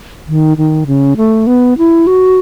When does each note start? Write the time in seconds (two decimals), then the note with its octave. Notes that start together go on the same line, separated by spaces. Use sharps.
0.28 D#3
0.57 D#3
0.87 C#3
1.17 A3
1.47 B3
1.78 E4
2.07 F#4